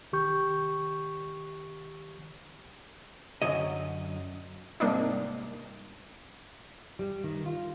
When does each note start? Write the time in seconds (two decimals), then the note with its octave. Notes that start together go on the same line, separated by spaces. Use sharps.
0.12 C2 D#3 G4 C#6 G6
3.42 F#2 D3 F#3 D#5
4.80 G#2 C3 G3 A#3 D4 D#4
6.99 G3
7.24 D#3
7.46 F4